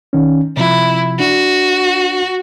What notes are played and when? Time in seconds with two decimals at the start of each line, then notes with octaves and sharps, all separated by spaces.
0.13 D#3 C#4
0.57 C3 F3 E4
1.20 D4 F#4